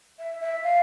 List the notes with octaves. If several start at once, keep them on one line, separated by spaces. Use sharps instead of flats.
E5
E5
F5